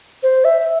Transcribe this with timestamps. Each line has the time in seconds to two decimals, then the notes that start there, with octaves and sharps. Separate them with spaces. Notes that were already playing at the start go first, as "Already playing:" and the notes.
0.23 C5
0.45 E5